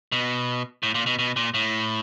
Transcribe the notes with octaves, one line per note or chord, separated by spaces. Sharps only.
B2
A2
A#2
B2
B2
A#2
A2